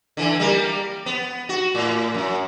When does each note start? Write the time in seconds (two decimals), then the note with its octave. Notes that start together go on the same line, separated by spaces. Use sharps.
0.17 D3 E3
0.39 G3 A#3
1.06 B3
1.49 F#4
1.75 A2
2.14 F#2